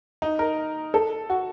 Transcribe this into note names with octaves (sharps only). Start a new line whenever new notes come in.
D#4
A#4
A4
F#4